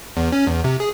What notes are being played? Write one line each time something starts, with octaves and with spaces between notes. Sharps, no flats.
E2
C#4
E2
C3
G#4